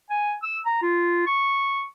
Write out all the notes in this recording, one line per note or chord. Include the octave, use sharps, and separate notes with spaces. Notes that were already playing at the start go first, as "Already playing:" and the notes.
G#5
E6
A#5
F4
C#6